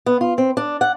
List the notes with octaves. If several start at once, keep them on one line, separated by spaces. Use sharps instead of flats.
B3
F4
C4
D4
F#5